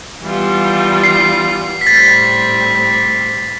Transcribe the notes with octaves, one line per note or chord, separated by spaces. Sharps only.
E3 G3 B3 F4
C7
B6
A2 G3 C4 A6